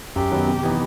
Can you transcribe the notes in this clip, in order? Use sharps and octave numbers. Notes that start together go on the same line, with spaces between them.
F#2 G4
D#3 F#3 B3
C3
E3 B3 D#4